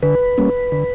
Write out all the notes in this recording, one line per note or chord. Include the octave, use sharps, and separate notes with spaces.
D3 B4
G3 A#3 C#4
D3